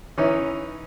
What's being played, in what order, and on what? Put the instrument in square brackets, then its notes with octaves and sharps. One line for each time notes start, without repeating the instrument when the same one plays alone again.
[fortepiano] E3 C#4 D#4